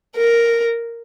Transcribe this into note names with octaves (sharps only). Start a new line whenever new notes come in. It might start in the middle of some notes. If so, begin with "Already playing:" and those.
A#4